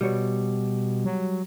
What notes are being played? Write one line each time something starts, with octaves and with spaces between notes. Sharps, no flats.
B2 G3 C#5
F#3